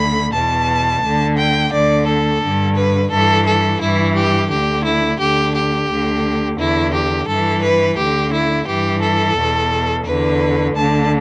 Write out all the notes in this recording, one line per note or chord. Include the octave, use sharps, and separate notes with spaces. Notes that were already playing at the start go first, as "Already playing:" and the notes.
Already playing: D2 D3 B5
E2 B2 A5
D2 D3
G5
D2 D3 D5
A4
G2 D3
B4
G2 E3 A4
A4
G2 E3 E4
G4
D2 D3 G4
E4
D2 D3 G4
G4
D2 D3
E2 D3 E4
G4
G2 E3 A4
B4
D2 D3 G4
E4
G2 E3 G4
A4
E2 B2
E2 D3 B4
D2 D3 A5